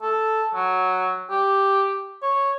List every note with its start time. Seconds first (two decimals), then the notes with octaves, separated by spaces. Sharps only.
0.02 A4
0.55 F#3
1.30 G4
2.22 C#5